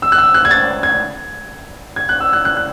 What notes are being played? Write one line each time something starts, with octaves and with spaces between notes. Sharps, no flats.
E6
F#6
E6
F#6
G#6
A6
G#6
G#6
F#6
E6
F#6
F#6
F#6